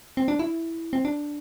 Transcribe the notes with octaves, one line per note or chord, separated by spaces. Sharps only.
C4
D4
E4
C4
D4